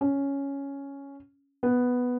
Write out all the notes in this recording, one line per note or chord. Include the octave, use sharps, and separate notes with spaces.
C#4
B3